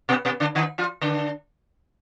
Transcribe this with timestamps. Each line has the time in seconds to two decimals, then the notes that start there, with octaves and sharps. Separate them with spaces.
0.09 B2 B3
0.25 B2 B3
0.40 D3 D4
0.55 D#3 D#4
0.78 F3 F4
1.01 D3 D4